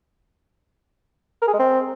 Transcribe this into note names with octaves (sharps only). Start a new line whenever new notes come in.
A#4
G#4
G#3
C4